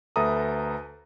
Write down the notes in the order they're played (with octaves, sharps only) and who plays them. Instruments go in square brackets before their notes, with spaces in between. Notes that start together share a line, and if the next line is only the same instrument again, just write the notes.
[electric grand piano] D2 A4 B4 E5 A#5 D#6